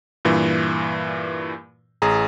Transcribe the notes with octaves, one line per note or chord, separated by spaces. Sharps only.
G2 A#2 E3
A1 G#4 A#5